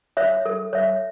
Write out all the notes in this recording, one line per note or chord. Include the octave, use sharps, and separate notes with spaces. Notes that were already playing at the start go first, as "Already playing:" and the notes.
C#5 E5
A4
C#5 E5